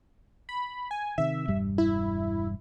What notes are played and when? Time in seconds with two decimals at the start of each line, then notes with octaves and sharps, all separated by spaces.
0.49 B5
0.91 G#5
1.18 C3 D#3 E5
1.48 E1 G2 G3
1.78 E4